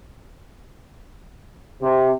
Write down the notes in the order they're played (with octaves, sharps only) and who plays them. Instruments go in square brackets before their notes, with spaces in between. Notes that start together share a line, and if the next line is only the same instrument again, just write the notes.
[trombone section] C3